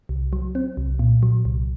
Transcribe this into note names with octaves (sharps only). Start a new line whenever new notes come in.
C2
F#3
C4
C2
A#2
F#3
C2